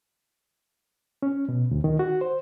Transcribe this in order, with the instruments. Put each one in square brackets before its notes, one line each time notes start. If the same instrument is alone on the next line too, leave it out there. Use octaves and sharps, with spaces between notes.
[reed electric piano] C#4
B2
D2
D#3
F#4
C5